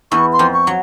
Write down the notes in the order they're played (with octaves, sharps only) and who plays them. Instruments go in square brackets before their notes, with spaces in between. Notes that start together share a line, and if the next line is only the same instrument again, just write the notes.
[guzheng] E2 E3 [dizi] C#6
[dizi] C6
[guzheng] F2 F3
[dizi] C#6
[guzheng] F#3